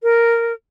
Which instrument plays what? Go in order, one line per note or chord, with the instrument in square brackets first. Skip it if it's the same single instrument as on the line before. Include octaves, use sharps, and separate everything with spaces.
[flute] A#4